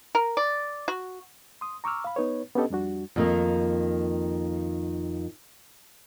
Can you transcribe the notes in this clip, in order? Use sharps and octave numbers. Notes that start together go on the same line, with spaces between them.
A#4
D5
F#4
C6 D#6
A#5 C#6 D6 E6 F6
F5 B5
B3 D#4 B4 C#5
B3 C#4 D4 G4 A4 D#5
F2 G3 D4 F#4
F2 D#3 A#3